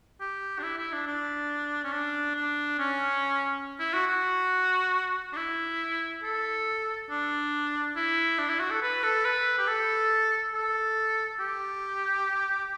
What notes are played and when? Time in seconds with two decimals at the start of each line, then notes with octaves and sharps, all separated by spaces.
0.21 G4
0.59 D4
0.63 E4
0.78 E4
0.92 D4
1.07 D4
1.84 C#4
1.92 D4
2.35 D4
2.79 C#4
3.79 E4
3.93 F#4
4.07 F#4
5.33 D4
5.36 E4
6.23 A4
7.10 D4
7.96 E4
8.38 D4
8.49 E4
8.60 F#4
8.70 A4
8.82 B4
9.03 A4
9.25 B4
9.58 G4
9.67 A4
10.54 A4
11.40 G4